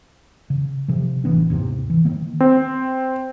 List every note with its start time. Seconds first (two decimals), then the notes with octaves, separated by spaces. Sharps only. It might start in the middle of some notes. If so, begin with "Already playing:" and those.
0.50 C#3
0.88 C3 F3
1.24 A1 E3 B3 D4
1.50 D#2 G#2 C3
1.90 E3
2.05 D#3 A#3 B3
2.40 C4